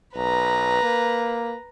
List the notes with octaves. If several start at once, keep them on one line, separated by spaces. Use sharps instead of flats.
B1 B4 A#5
A#3